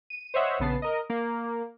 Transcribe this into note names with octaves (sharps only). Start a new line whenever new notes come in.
D#7
C5 C#5 D#5 E5 F#5
A#1 C#3 B3 A5 C7
A#4 D#5
A#3